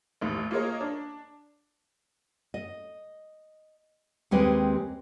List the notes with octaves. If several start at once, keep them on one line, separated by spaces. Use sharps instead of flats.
A1 D#2
A#3 F4 G#4 A#4 C#5 D#5
D4
D#5
D#2 G#3 C4 G4 B4